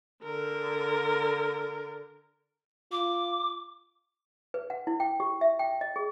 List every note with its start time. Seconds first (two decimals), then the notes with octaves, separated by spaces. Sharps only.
0.24 D3 A#4
2.92 F4 D6
4.54 B4
4.70 F#5
4.87 E4
5.00 G5
5.20 G4
5.41 E5
5.59 G5
5.81 D#5
5.96 G#4